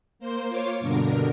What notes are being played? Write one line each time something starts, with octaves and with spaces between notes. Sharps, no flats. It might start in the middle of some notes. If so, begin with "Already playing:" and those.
A#3 C5 C6
F4 C#5 D6
G2 B2 D3 A#4